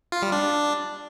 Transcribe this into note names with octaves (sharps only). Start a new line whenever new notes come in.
F4
G3
D4